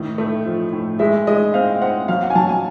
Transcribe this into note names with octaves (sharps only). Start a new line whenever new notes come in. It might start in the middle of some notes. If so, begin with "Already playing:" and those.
Already playing: A2 D#3
A3
F3
A2
G#3 E5
G#3 D#5
C4 F5
C4 F#5
F#3 F5
F#5
G#5
F#3 A5
G#5